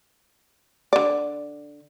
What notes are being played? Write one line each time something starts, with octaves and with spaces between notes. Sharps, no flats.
D3 D5